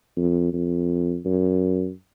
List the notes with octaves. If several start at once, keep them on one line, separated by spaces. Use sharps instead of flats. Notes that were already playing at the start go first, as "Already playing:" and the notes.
F2
F2
F#2